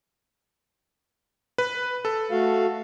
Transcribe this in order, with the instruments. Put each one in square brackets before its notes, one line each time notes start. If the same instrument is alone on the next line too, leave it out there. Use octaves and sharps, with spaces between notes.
[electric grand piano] B4
A4
[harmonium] A3 F#4 F5